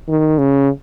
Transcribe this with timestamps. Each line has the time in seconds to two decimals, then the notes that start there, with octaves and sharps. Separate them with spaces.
0.08 D#3
0.38 C#3